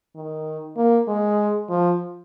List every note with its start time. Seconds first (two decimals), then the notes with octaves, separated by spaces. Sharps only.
0.15 D#3
0.77 A#3
1.08 G#3
1.69 F3